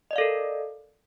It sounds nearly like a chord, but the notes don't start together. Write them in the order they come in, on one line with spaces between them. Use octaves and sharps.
D#5 D5 F5 A4 A#4